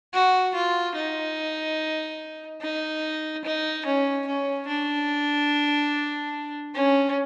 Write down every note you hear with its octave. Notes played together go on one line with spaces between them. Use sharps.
F#4
F4
D#4
D#4
D#4
C#4
C#4
D4
C#4